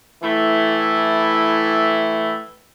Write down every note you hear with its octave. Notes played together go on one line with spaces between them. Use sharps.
A2 E3 A3 E4